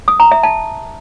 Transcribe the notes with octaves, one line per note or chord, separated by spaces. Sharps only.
D#6
A#5
E5
A5